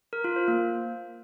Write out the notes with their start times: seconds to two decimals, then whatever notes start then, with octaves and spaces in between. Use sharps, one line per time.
0.13 A#4
0.24 F4
0.36 C5
0.48 A#3